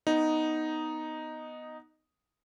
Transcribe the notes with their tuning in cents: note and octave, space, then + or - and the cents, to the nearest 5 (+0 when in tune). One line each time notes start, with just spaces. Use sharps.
B3 +0 D#4 +0